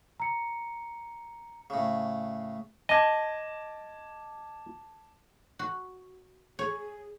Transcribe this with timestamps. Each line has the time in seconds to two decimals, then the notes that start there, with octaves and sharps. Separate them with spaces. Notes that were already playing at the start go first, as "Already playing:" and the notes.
0.20 A#5 C#7
1.70 A2 C#3
2.89 D#5 A5 D6 G#6
5.59 F#4
6.59 G#4 C#5